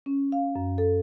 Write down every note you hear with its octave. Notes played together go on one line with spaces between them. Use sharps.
C#4
F5
F#2
A4